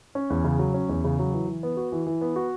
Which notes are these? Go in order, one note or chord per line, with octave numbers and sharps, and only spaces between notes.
C#4
E2
C#3
F#3
C#4
E2
C#3
F#3
E3
E3
B3
F#4
E3
E3
B3
F#4